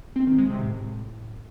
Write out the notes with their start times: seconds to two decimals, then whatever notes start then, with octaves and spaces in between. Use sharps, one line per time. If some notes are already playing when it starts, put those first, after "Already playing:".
0.16 C4
0.27 D#3
0.39 G#3
0.50 C3
0.61 A2